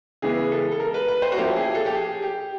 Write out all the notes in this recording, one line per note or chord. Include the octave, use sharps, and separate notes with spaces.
C#3 E3 G#3 B3 G#4
A4
A4
A#4
B4
B4
C5
F#4
F3 A#3 C#4 E4 G4
G#4
A4
G4
G#4
G4